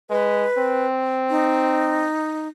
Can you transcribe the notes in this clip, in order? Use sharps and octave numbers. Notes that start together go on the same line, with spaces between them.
G#3 B4
C4
D#4